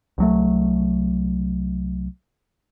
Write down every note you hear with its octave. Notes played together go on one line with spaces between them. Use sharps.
C2 F#3 A3